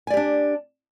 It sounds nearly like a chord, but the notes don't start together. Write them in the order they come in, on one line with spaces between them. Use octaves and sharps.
G#5 D5 G4 D4